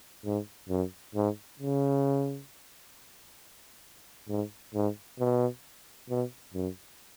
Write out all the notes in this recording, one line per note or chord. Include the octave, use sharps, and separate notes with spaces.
G#2
F#2
G#2
C#3
G#2
G#2
B2
B2
F#2